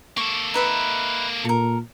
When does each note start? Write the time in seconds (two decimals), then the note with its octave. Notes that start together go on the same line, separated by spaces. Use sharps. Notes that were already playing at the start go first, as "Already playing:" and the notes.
0.17 A#3 A4 C#6 D6
0.54 D#4 B4 E5
1.45 A#2 A4 A#4